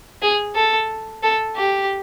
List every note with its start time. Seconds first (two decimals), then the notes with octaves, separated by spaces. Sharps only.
0.22 G#4
0.55 A4
1.23 A4
1.56 G4